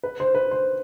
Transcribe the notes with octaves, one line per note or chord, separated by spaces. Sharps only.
B4
C5
B4
C5